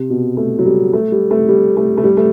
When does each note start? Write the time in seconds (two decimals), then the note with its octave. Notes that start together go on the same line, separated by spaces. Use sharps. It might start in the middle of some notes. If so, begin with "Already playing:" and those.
Already playing: C3
0.10 B2
0.37 A3
0.59 F#3
0.65 G3
0.93 A3
1.12 G3
1.31 A3
1.49 G3
1.77 A3
1.98 A3
2.04 G3
2.17 A3